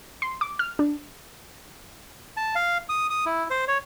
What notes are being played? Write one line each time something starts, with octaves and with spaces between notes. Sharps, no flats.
C6
D6
F6
D4
A5
F5
D#6
D#6
E4
C5
C#5